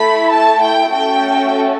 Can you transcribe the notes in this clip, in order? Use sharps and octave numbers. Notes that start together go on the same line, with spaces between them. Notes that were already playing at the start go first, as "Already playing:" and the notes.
Already playing: A3 E4 A4 B5
A5
G5
A3 C#4 F#4 A4 G5